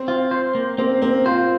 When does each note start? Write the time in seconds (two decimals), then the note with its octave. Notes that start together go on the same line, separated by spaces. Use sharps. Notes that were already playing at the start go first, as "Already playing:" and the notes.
Already playing: C4
0.08 F4
0.31 C5
0.55 A#3
0.78 A#3 C4
1.02 A#3 C4
1.26 F4 C5